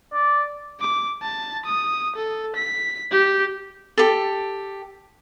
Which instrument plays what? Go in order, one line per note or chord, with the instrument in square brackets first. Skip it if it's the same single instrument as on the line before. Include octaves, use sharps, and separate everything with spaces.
[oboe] D5
[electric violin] D6
A5
D#6
A4
B6
G4
[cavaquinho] G4 A4